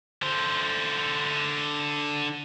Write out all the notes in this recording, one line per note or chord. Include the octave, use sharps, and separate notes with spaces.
D3 C5